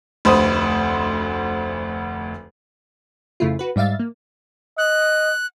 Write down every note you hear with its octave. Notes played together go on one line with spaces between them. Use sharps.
F1 D2 C5 B5 D#6
F2 C#3 A3 E4 F4
F#4 B4
G#2 G3 E5 F5 A6
A#3
D#5 F#6